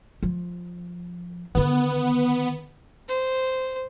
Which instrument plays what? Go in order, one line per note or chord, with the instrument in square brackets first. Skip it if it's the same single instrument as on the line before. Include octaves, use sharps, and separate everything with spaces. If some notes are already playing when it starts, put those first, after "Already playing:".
[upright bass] F3
[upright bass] D3 D#3 [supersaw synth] B3
[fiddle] C5